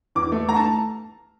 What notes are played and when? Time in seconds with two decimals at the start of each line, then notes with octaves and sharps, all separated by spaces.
0.15 E2 D6
0.32 A3
0.49 A#5
0.56 A5